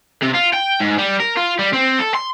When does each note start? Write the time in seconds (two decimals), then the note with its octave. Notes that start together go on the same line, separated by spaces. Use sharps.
0.22 C3
0.34 F4
0.53 G5
0.80 G#2
0.98 G3
1.20 A#4
1.37 F4
1.59 G3
1.73 C4
1.99 A4
2.15 C6